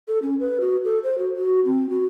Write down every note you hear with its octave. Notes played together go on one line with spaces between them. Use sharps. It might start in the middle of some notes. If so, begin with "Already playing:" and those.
A4
C#4
B4
F#4
A4
C5
F#4
F#4
C4
F#4